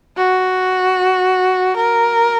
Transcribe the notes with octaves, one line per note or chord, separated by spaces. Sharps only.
F#4
A#4